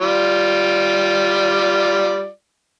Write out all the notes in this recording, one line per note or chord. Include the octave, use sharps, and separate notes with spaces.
G3 F4 D5